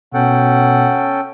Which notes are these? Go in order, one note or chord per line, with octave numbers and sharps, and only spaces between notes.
B2 C#4 A4 F#5 G5